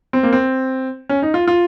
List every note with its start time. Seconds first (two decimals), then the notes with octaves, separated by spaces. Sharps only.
0.13 C4
0.23 A#3
0.33 C4
1.09 C#4
1.22 D#4
1.34 F4
1.48 F4